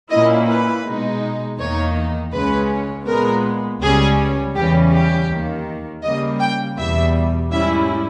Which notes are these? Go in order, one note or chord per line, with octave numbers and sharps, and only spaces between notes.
A#2 A#3 C#4 E4 D#5
B4
B2 G#3 D#4
E2 D#3 A#3 D#4 C#5
C#2 C#3 G#3 C#4 B4
A#2 G#3 B3 A#4
C#2 C#3 G3 C#4 G#4
E2 C#3 E3 G3 C#4 G4
G4
D#2 D#3 A#3
C#3 G3 A#3 D#5
G5
E2 B2 G3 E5
G#2 G3 C#4 E4 E5